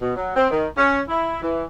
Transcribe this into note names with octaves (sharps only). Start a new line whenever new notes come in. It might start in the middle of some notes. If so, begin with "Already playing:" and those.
B2
F#3
C4
D#3
C#4
E4
E3